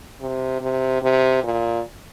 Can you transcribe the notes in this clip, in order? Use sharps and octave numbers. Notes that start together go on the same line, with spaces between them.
C3
C3
C3
A#2